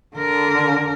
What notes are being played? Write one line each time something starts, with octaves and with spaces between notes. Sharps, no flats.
D3 A#4